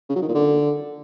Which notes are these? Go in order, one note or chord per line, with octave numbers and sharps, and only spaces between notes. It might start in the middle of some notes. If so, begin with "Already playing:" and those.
C#3
F#3
D#3
A#2
D3